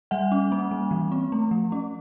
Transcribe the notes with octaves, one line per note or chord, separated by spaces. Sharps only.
G3 E5 F#5
C#4
A#3
G3
E3
C4
A3
F3
C#4